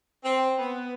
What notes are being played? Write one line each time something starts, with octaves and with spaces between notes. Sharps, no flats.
C4
B3